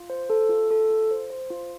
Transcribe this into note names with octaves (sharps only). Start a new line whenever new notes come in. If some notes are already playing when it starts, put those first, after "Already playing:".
Already playing: F4
C5
A4
F4
A4
F4
C5
C5
F4